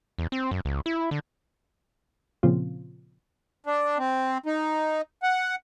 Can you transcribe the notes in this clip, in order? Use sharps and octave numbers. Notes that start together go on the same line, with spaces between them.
E2
C4
F#2
C#2
E4
D3
A#2 C#3 F3 C4 F4
D4
C4
D#4
F#5